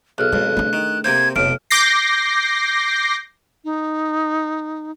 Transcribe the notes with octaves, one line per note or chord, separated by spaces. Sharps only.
B1 G#4 A4 F6 F#6
B1 F2 G#3
A3 D4
D#3
C3 A#3 C4 G6 G#6
F1 B1 A2 F6 D7
D6 G6 A#6 C7
D#4